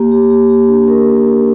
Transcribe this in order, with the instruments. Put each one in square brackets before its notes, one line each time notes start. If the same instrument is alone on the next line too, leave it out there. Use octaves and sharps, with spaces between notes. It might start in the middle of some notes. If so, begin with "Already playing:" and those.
Already playing: [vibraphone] A#3 G4
G4
G4
G4
D4
A#4